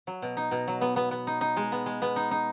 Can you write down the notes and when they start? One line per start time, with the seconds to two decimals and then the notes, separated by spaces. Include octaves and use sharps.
0.07 F#3
0.22 B2
0.37 D#4
0.51 B2
0.67 F#3
0.81 B3
0.96 B3
1.11 B3
1.27 D#4
1.41 D#4
1.56 G#3
1.72 B3
1.86 G#3
2.02 B3
2.16 D#4
2.31 D#4